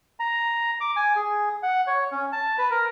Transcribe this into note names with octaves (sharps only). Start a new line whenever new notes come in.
A#5
D6
G#5
G#4
F#5
C#5
C#4
A5
B4
A#4